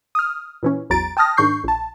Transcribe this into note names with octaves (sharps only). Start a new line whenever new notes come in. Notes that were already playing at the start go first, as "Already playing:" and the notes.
D#6 F6
A#2 E3 C#4
A1 E2 F#3 A#5 A6 D7
G5 A5 D#6 F6 A#6
G#2 D#3 D4 C#6 G6 C7
A#1 A5